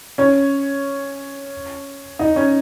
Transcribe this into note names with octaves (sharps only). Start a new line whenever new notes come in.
C#4 C#5
D#4 D#5
C#4 C#5